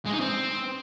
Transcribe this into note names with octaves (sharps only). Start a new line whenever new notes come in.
G#3
D#4
C4